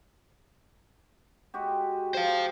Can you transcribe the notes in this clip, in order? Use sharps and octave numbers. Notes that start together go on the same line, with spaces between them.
G#3 F#4 G4
C5 F5